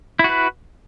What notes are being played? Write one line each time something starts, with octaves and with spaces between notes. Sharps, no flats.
E4 F#4 B4